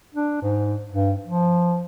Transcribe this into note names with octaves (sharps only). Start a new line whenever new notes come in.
D4
G#2
G2
F3